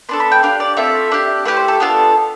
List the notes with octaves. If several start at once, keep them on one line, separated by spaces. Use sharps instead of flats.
B3 D4 A4 C6
B5
G5
D4 G4 F5
D5
A3 C4 F4 A4 E5
D4 G4
A3 E4 G4 B4
C5
A4
B3 D4 F4 A4